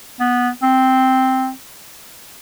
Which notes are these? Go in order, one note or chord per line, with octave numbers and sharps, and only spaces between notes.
B3
C4